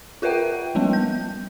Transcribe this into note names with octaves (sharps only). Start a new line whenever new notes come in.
F4 A#4 B4 E5 F#5 G5
F3 G3 B3 C#4
G6